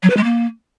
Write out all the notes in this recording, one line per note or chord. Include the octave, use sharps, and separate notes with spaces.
F#3
B4
G#3
A#3